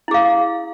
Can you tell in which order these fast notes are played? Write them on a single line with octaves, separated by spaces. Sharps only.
E4 G#4 F5